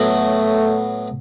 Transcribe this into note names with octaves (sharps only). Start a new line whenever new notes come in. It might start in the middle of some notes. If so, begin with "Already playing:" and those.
Already playing: A2 F#3 A3 B3 F#4